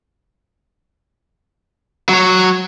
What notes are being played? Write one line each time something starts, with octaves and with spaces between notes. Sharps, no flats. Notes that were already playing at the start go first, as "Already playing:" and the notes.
F#3 C#5